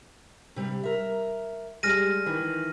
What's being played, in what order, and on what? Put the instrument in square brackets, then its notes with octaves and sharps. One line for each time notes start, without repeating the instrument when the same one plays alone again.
[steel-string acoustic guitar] C3 G3
A#4 E5
[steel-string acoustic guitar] G3 G#3 [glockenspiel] F6 A#6 D#7
[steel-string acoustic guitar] D#3 E3